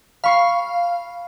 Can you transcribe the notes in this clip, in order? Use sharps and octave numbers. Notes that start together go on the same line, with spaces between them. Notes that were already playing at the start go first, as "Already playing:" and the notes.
F5 B5 C#6 C7